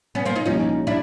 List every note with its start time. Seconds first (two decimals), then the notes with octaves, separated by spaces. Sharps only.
0.15 B3 C#4
0.25 A#3 C4
0.36 D#4 F4
0.46 C2 A#2 F3 C#4 D#4
0.87 D4 E4